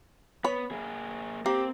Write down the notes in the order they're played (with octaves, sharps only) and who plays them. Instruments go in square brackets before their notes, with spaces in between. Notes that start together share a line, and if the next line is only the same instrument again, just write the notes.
[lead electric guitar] B3 [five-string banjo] C#5 B5
[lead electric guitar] A#3 G#4
[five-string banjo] A#3 [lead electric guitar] C4 [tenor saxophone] G4